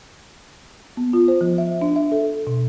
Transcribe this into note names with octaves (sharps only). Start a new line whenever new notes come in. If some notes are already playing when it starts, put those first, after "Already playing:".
B3
F4
C5
F3
E5
D4
E5
A4
B2